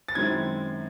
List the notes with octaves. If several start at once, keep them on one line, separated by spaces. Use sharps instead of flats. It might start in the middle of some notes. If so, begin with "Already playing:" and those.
A6
F#2 D#3 G#3 C4 E4 G#6